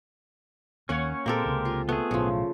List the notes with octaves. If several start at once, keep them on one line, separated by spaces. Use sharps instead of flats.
D#2 A#3 C#4 C#5 F5 F#5
A#2 G#3 A#3 C4 G4 A4 A#4
C#2 C3
F4
A3 B3 G#4
B1 A2 C#3 F3